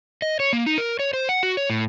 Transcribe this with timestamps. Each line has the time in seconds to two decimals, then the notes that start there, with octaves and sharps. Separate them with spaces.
0.22 D#5
0.40 C#5
0.53 A#3
0.66 D#4
0.78 A#4
0.99 C#5
1.13 C5
1.29 F#5
1.43 F#4
1.57 C#5
1.70 A2